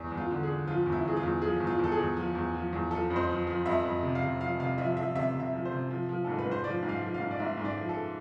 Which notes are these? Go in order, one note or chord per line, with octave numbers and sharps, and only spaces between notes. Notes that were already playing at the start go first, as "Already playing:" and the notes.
Already playing: E2
E2
F4
D3
G#4
D3
F3 F4
E2
E4
E2 G#4
F4
E2
F3 G#4
E2
F4
E2 A4
G#4
E2
F3
E2
F3
E2
F3 A4
F2
C5
F3
F3
F2 E5
F2
C3
F5
C3
F3 F5
C3 F5
F3 E5
F3 E5
C3 E5
C3
E5
F3
C5
C3
F3
F3
G#2 A4
B4
G#2
C5
F3 D5
G#2
F5
F3
F5
G#2
D5
G#2 E5
G#2
D5
F3
A4